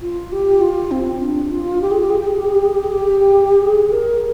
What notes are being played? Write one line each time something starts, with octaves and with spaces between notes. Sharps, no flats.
F4
G4
F4
C4
D4
F4
G4
G#4
G4
G#4
G4
G#4
G4
G#4
G4
G#4
G4
G#4
G4
G#4
A#4